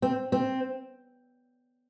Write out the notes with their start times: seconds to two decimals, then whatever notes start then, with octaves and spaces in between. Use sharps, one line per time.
0.02 C4
0.32 C4